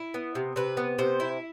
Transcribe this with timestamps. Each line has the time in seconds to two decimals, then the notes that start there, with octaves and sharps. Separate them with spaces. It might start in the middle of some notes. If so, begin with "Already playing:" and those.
Already playing: E4
0.14 B3
0.35 C3
0.56 C3 B4
0.77 B3
0.99 C3 C5
1.20 E4